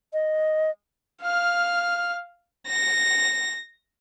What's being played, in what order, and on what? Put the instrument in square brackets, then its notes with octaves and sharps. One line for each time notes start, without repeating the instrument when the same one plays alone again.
[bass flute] D#5
[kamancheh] F5 F6
[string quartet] A#6